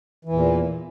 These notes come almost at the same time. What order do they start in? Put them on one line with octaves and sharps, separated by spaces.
E3 E2 A#2